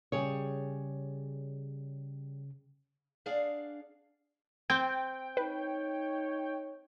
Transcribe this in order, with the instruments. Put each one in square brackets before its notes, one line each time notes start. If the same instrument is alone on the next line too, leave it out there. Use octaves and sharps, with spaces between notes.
[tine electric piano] C#3 [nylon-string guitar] G3 G#4 C#5
[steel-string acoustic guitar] D4 G#4 D5 F5 F#5
[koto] C4 [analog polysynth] G5 [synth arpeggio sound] G6
[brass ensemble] D#4 C#5 [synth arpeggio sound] B4